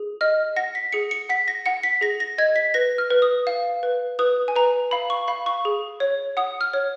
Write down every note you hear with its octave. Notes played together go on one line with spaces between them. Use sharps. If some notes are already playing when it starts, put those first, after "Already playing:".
Already playing: G#4
D#5 F6
F#5 A#6
B6
G#4 C#7
C#7
F#5 B6
A#6
F#5 C#7
B6
G#4 A#6
A#6
D#5 G#6
B6
B4 A#6
F6
B4
D#6
F5
B4
B4 D#6
G#5
B4 A#5
F5 B5
C#6
F5 B5
C#6
G#4
C#5
F#5 D#6
F6
C#5